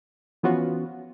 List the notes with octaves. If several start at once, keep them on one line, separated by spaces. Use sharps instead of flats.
E3 F3 B3 C#4 F4 F#4